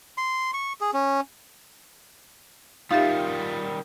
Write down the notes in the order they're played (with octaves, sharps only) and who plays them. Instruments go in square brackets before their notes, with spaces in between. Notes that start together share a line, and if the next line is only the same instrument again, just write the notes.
[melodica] C6
C#6
G#4
C#4
[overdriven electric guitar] D#3 G3 [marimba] D#4 G4 E5 [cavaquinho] F4